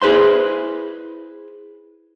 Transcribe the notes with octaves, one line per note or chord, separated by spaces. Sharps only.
E4 G#4 B4 C5 C6